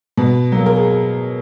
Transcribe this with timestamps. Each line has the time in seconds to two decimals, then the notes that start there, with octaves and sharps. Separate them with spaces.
0.17 B2
0.52 F#3 A#3
0.66 A#4
0.76 G#4